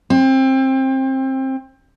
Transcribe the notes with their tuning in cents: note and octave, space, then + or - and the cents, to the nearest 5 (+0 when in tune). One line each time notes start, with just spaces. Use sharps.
C4 +25